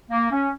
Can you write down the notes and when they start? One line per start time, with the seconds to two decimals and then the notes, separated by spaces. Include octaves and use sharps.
0.10 A#3
0.31 C#4